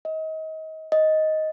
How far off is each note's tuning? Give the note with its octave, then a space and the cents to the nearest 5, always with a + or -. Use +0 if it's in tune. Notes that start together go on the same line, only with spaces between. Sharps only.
D#5 +30
D#5 +10